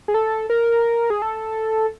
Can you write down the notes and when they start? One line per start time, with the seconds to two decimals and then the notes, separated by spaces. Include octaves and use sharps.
0.08 G#4
0.14 A4
0.50 A#4
1.10 G#4
1.22 A4